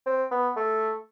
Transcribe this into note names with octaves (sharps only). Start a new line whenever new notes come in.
C4
B3
A3